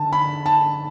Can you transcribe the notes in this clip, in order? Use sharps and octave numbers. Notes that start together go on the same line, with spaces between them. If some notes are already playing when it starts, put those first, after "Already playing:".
Already playing: D3 A5
B5
A5